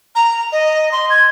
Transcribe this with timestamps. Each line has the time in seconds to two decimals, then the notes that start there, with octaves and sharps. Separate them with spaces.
0.15 A#5
0.52 D#5
0.92 C6
1.10 G#6